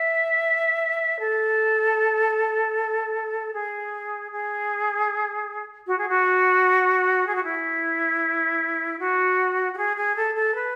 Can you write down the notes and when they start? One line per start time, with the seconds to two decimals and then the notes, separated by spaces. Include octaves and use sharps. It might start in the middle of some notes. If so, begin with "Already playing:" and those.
Already playing: E5
1.19 A4
3.53 G#4
4.31 G#4
5.87 F#4
5.98 G#4
6.08 F#4
7.26 G#4
7.35 F#4
7.43 E4
8.99 F#4
9.73 F#4
9.77 G#4
9.96 G#4
10.15 A4
10.35 A4
10.54 B4